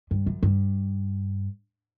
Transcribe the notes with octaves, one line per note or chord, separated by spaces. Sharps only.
G2
F#2
G2